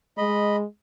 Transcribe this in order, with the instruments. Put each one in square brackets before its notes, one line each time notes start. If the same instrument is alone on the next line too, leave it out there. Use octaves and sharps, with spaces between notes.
[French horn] G#3 [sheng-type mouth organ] D#5 B5